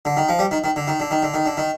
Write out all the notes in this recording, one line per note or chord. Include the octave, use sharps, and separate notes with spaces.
D3
D#3
F3
G3
D#3
D#3
D3
D#3
D3
D#3
D3
D#3
D3
D#3